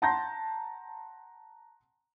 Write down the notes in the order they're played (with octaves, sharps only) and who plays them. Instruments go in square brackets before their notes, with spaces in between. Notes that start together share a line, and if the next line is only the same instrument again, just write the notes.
[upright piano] F#5 A5 A#5 C6 G6 A#6